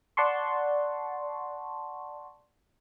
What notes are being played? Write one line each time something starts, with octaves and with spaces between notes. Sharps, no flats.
D5 F#5 A5 C6 C#6